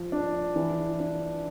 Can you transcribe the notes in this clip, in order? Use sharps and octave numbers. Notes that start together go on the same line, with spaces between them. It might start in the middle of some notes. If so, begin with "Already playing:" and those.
Already playing: F3
D4
E3
D4